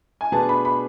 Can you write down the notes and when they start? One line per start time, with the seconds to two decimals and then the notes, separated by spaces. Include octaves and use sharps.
0.21 G#5
0.32 B2 A3 D4 G#4 B4 A5
0.49 B5
0.65 B5